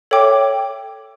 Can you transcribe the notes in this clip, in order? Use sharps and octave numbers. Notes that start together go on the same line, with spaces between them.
A4 C#5 E5 G5 D6